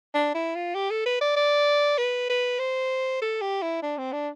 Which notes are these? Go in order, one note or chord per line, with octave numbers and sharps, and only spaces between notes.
D4
E4
F4
G4
A4
B4
D5
D5
B4
B4
C5
A4
G4
E4
D4
C4
D4